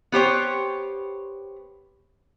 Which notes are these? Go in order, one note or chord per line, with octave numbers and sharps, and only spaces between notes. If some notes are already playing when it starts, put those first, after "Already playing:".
B3 G4 C5 C#5